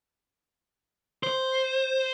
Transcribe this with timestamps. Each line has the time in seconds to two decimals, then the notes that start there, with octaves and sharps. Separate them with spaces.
1.23 C5